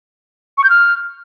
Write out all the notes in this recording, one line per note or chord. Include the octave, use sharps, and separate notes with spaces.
C#6
G6
F6